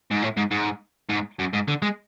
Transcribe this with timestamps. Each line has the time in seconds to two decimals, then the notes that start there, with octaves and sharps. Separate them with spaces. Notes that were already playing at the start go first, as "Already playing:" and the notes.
0.11 G#2
0.23 A2
0.37 G#2
0.51 G#2
1.09 G#2
1.39 F#2
1.53 G#2
1.68 D3
1.82 G#3